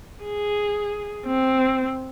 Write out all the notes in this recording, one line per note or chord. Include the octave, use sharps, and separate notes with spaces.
G#4
C4